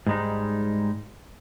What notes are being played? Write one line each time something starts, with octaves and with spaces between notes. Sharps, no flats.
G#2 G3 G#3 D#4